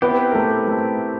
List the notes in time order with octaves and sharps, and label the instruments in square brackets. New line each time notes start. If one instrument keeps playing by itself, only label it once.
[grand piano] B3 B4 [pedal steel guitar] C4 E4 G4
[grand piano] A#4
A3 A4
A3 A4